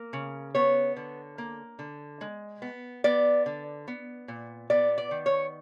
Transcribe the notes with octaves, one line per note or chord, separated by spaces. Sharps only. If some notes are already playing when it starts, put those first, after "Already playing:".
Already playing: A#3
C#3
B3 C#5
D3
A#3
D3
G#3
B3
B3 D5
D3
B3
A#2
B3 D5
D5
D#3
C#5